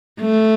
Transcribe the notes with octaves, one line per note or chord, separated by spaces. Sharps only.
A3